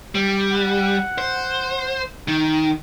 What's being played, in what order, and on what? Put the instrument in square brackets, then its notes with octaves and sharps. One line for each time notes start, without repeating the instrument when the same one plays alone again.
[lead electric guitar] G3
[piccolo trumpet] F#5
[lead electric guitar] C5
D#3